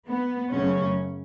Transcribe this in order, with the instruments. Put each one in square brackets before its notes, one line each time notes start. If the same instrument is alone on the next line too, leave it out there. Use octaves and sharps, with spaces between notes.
[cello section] B3
F#2 C#3 F#3 A3 C#4